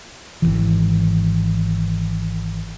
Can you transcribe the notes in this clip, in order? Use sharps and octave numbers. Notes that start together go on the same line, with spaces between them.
G#1 C#2 E3